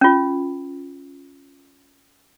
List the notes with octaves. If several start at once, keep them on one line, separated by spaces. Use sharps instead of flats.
C#4 F4